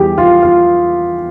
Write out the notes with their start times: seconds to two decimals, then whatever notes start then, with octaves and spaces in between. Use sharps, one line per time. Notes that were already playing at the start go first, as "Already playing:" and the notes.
Already playing: E2 E3 G3 G4 G#4
0.18 F4
0.43 F4